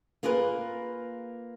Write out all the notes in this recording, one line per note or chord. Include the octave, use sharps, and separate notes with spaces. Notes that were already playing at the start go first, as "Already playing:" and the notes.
A#3 F4 G#4 A#4 B4